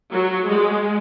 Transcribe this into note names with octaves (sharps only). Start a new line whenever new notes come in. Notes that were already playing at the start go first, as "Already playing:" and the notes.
F#3
G#3